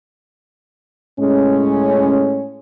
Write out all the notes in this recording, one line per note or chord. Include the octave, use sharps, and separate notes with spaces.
A2 G#3 C#4